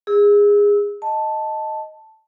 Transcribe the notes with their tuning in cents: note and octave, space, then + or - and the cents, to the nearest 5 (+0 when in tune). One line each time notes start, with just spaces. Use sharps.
G#4 -20 E6 -25
D#5 +0 A5 +0